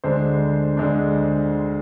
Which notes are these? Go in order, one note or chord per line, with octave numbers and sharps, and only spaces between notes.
D2 D3 G#3 D4 C5
D2 D3 G#3 D4